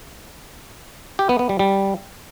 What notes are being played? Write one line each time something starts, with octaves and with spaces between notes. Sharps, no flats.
G4
B3
B3
G3
G3